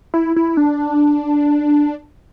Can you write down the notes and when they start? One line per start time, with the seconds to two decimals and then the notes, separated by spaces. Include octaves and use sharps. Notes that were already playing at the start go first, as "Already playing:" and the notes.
0.14 E4
0.36 E4
0.57 D4